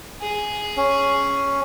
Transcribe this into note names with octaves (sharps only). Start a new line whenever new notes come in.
G#4
C#4